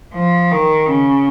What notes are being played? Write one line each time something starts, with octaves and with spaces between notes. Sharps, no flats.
F3
D#3
C#3